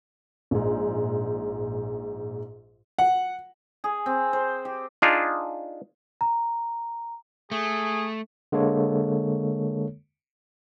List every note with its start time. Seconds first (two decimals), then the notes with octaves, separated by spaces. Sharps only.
0.51 A#1 G#2
2.99 F#5
3.84 G#4
4.06 C4
4.33 C5
4.65 G4
5.02 D4 D#4 F4 G#4
6.21 A#5
7.52 A3 G#4
8.52 D3 G#3 A#3 A4 C#5